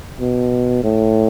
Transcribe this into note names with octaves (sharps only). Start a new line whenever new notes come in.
B2
A2